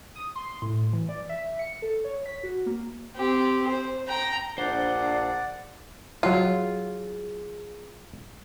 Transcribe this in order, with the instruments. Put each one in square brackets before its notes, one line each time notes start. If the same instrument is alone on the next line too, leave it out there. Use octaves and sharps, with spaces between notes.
[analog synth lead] D#6
C6
A2
E3
D5
E5
C#7
A4
C#5
B6
F#4
A#3
[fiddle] C4 G4
C5
G5 A#5
[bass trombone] A#1 [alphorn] D4 [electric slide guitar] C5 [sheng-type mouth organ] D5 F#5
[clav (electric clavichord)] F#3 F5 [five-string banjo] F4 [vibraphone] G#4